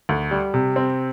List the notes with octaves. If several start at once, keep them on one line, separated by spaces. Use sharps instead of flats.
D2
G3
C3
C4